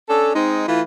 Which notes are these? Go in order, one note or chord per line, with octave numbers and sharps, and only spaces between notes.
C#4 D4 A4
G#3 C4 D#4
E3 A3 E4 F4